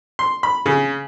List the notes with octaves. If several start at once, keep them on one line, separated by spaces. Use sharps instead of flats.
C6
B5
C#3